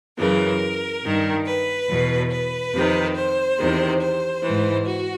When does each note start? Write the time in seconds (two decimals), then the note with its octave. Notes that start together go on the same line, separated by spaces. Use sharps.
0.18 F#2 C#3 E3 A#4
1.04 G2 D#3
1.45 B4
1.88 E2 B2
2.31 B4
2.73 F2 C3 D#3
3.16 C5
3.58 E2 C3 D#3
4.01 C5
4.43 G#2 E3
4.85 F#4